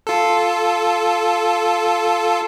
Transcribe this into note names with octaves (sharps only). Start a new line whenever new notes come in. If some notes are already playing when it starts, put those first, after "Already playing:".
F4 A4